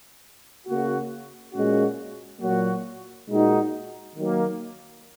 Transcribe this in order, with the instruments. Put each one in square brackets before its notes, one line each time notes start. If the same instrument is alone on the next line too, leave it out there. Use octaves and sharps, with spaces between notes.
[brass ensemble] C#3 A#3 F#4
A#2 G#3 C#4 F#4
A#2 F#3 A#3 F#4
A#2 G#3 D#4 F#4
D#3 F#3 A#3